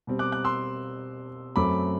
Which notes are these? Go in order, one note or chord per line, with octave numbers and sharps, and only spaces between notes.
B2 G3 C4
D6 F#6
D6 F#6
C6 E6
F#2 F#3 A3 C4 B5 D6